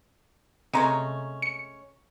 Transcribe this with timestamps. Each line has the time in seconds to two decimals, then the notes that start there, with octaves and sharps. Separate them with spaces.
0.73 C3 G#3 A3 C#4 A#5
1.42 C#7